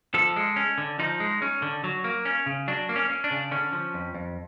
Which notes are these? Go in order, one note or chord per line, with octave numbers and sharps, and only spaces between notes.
F3 A4
G#3
C#4
D3
F3 D#4
G#3
C#4
D3
F#3
A#3
C#4
C#3
F#3 D4
A#3
C#4
C#4
D4
C#3
D3 C#4
F3
F2
F2